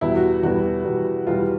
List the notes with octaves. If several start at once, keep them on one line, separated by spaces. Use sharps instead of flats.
E2 B2 G3 B3 E4
F#4
E2 B2 G3 B3 F#4
E2 B2 G3 B3
E2 B2 G3 B3 F4